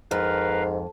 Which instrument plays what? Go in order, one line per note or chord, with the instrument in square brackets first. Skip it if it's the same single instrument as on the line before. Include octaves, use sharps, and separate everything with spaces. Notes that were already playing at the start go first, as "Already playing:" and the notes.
[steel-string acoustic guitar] F2 [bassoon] G#2 [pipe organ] A#4 B4 F5